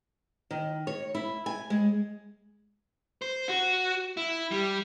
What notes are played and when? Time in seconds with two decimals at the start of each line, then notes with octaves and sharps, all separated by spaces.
0.51 D#3
0.87 C#5
1.15 E4
1.46 G#5
1.70 G#3
3.22 C5
3.49 F#4
4.17 E4
4.51 G3